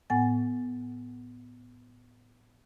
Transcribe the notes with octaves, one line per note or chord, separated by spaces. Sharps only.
A2 B3 F#5 G#5 A6